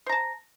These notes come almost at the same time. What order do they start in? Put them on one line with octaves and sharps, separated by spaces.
C5 A#5 A5